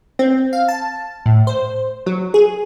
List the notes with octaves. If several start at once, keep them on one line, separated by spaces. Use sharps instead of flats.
C4
F5
A5
A2
C5
F#3
G#4